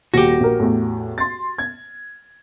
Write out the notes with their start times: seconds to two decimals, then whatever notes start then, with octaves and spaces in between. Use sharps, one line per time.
0.14 D#1 F#4 G4 A#6
0.40 A#1 A#4
0.60 E2 A2
1.18 C6 A6
1.58 G#6